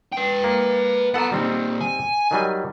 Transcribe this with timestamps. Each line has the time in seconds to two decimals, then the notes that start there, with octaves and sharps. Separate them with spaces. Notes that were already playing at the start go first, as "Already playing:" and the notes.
0.12 B4 G5
0.44 A#3
1.14 B3 A4 F#5 A#5
1.32 A#2 D#3 G3 C4 D#4
1.81 G#5
2.31 D#3 F#3 G3